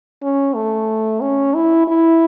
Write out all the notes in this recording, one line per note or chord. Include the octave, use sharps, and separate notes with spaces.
C#4
A3
C#4
E4
E4